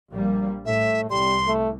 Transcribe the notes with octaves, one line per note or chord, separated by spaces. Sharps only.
A#1 G3 A#3
A2 A3 E5
C2 G3 C6
A3